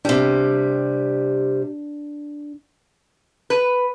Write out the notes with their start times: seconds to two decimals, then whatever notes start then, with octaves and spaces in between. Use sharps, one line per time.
0.05 C3 G3 D4
3.50 B4